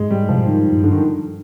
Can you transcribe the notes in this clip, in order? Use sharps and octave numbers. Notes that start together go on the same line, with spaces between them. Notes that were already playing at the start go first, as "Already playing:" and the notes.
Already playing: G#2 G#3
G3
C3 F3
A#2
G#2 D#3
G2
D3
D#3